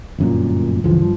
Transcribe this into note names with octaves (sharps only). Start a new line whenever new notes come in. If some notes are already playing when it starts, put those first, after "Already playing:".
G1 F#2 A#2
G1 C#2 E3 F3
G2 F3